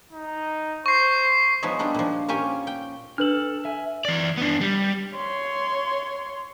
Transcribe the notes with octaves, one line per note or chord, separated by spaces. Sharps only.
D#4
C5 C#6 C7
F3 G#3 B3 D#4 C#5 E5
G3 B3 D4 D#4
A#2 F3
A#3 C#4 F4 G4 C#5 G#5
G5
D4 A4 B4 F6 F#7
E5 G#5
E3 D5
B3 D4
G3
C#5 C6